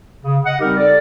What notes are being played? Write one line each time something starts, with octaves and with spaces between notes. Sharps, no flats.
C#3
D#5 F#5
G3 C4 D#4 G4 A#4
A4 D5